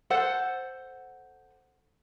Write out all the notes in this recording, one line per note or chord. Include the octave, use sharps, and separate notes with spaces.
A4 C5 F#5